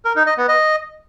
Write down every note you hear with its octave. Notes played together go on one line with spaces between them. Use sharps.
A#4
D#4
D#5
B3
D#5